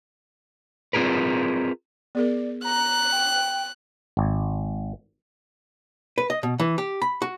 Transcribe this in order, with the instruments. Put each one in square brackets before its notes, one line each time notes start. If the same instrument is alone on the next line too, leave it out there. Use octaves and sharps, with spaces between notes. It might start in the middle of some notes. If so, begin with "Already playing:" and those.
[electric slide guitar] C4 F4 G#4 A#4 B4
[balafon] B3 G#4 A#4 [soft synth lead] D5
[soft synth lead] A#5 [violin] F#6
[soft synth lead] G5
[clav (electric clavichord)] G#1
[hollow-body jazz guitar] B4
D#5
B2
E3
G4
B5
F#4